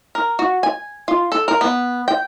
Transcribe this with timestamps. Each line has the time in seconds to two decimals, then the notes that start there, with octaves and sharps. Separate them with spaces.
0.15 A#4
0.39 F#4
0.63 G#5
1.08 F4
1.32 A4
1.48 A#4
1.61 B3
2.08 G5